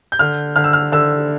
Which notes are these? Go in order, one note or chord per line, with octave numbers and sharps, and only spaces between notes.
G6
D3 F6
D3 F6
E6
F6
D3 E6